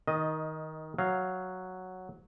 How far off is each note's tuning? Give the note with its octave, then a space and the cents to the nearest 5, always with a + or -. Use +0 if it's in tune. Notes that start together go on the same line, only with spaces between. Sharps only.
D#3 +15 D#5 +0
F#3 +0 F5 +0